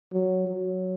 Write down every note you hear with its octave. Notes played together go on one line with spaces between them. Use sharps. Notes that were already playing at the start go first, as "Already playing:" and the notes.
F#3
F#3